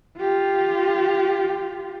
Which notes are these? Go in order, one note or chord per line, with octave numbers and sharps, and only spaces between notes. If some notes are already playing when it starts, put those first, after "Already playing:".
F4 G4